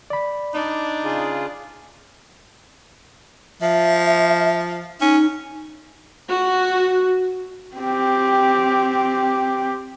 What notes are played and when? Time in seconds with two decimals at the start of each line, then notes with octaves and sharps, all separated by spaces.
0.10 D5 B5
0.54 D4 D#4
1.04 C#3 F4 G#4
3.62 F3 E5
5.01 C#4 D#4
6.28 F#4
7.76 C4 G4